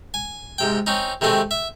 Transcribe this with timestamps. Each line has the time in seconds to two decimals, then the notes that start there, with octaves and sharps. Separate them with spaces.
0.14 G#5
0.58 G#2 C3 G5
0.87 C4 C#4 D#4
1.21 C3 D#3 G#3 A3 C4
1.51 E5